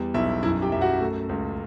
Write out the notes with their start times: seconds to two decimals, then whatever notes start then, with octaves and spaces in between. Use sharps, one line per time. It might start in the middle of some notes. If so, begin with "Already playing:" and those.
Already playing: E2 G3
0.14 B1 E4 E5
0.43 F#2 E4 E5
0.62 G4 G5
0.72 F#2 E5
0.81 F#4 F#5
1.01 A3
1.29 C#2